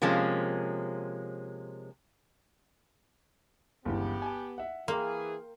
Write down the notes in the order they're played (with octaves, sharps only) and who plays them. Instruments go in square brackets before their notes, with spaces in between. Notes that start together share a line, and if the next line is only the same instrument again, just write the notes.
[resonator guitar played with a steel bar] C3 F3 G#3 A#3 C#4
[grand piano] G1 C#2 E3 [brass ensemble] B3 G4
[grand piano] G#5 A5
E5 F#5
[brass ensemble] E3 G#4 [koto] A#3 [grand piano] G5 C6